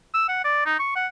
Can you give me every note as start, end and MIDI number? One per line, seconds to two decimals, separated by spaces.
0.14 0.24 88
0.29 0.42 78
0.44 0.66 74
0.66 0.75 63
0.79 0.91 85
0.96 1.07 78